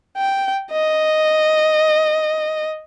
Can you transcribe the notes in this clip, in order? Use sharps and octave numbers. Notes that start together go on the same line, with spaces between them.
G5
D#5